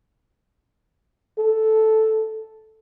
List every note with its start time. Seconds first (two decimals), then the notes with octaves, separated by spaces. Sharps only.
1.39 A4